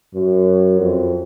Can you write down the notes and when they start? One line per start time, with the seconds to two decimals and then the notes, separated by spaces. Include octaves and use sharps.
0.15 F#2
0.79 F2